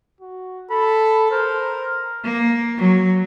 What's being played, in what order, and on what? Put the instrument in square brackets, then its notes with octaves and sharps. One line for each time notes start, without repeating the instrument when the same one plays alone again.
[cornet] F#4
[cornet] A4 [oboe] B5
[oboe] A#4 [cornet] C5
[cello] A#3
F#3